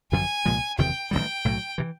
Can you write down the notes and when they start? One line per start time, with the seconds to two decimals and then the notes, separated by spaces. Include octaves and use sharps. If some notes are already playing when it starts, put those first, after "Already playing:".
0.11 G#1 F#2 D3 F3 G#5
0.45 C2 A#2 F3 G#3
0.78 F#1 E2 C3 D#3 G5
1.11 A1 G2 D#3 G3 G5
1.45 B1 A2 F#3
1.78 C3 E3